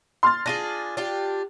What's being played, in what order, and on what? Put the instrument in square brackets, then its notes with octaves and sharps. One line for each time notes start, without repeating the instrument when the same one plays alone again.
[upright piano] C6 F6 A6
[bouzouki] D4 F4 G#4 [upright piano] A#6 D#7
[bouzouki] D4 F4 G4